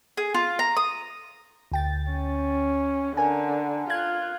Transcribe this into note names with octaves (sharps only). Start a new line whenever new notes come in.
G#4
F4
A#5
D#6
D2 G5 A6
C#4
D3 A#4 G#5
F4 F#6 G#6